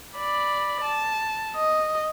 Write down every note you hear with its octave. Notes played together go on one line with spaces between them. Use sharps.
D5 B5
A5
D#5